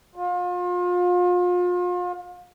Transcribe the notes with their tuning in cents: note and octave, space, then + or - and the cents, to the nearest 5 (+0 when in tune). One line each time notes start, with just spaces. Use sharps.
F4 +35